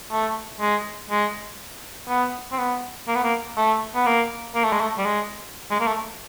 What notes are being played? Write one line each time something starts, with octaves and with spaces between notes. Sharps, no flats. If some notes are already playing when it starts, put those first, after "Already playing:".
A3
G#3
G#3
B3
C4
B3
A#3
B3
A#3
A3
B3
A#3
A#3
A3
G#3
A3
G3
G#3
G#3
A#3
A3